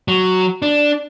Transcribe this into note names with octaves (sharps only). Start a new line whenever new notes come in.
F#3
D4